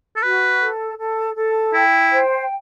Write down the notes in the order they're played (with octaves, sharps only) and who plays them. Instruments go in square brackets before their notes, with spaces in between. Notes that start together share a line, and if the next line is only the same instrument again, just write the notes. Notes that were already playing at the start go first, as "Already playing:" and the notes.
[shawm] A4
[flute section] F#4 [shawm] B4
[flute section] A4
A4
A4
[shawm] E4 [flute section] G5
[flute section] C5